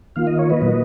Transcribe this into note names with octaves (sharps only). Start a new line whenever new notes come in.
D#3 A#3 F4 F5
D#5
C#5
B4 D#5
A#2 F#3 A#3